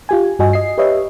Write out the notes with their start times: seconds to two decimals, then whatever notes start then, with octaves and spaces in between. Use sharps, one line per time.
0.09 F4 G4 G#5
0.39 G2 F#4 D#5 G#5
0.53 D#5 C7
0.78 G4 B4 C#5 D#5 E5